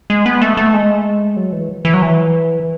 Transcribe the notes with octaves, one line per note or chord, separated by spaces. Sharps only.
G#3
B3
A3
A3
G#3
F#3
E3
E3
F#3
E3